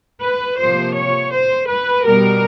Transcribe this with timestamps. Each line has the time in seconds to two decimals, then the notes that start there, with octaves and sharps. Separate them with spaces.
0.23 B4
0.59 C3 F3 A#3 C5
0.95 C#5
1.32 C5
1.68 B4
2.04 B2 G3 B3 A#4